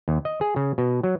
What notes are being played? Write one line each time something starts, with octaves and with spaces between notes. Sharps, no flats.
D#2
D#5
G#4
C#3
B2
F#3